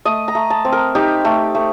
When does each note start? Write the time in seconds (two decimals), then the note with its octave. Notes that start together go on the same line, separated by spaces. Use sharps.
0.05 A3 D#5
0.28 A#5
0.35 A3
0.50 A5
0.65 C4
0.72 A#4
0.95 D#4 G4
1.25 A3
1.55 A3